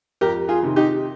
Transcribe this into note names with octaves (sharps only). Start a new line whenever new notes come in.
F2 G4 A#4
F4 G#4
C3 D#3
D#4 G4